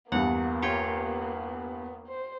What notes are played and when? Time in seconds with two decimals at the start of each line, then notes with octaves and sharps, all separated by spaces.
0.12 E2 G2 A#3 B3 F#5
0.62 F4 G4 C#5
2.07 C5